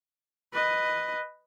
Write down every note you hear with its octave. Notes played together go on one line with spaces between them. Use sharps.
B4 D#5